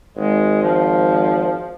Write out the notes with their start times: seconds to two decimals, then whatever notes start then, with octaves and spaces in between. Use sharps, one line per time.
0.17 G#1 G#3
0.62 F3